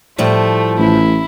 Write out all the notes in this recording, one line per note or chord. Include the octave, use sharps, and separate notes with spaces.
A2 F3 G3 A3
A1 E4